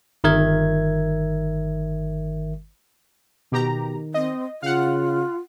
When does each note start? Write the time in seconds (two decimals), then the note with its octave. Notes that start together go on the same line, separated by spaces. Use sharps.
0.24 G1 D#3 A#4 E5 G#6
3.52 B2 D#3 G4 A#5
4.14 C4 D#5
4.63 C#3 F4 F5 F#5